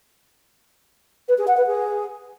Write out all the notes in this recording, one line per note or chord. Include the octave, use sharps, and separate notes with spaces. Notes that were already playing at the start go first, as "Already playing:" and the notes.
B4
G#4
F#5
B4
G#4